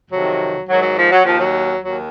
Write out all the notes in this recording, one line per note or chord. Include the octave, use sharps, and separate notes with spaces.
F2 C3 D#3 F#3
G#2 D#3 F#3
F#3
F3
F#3
D#2 D#3 F3
F#3
D#2 D#3 F#3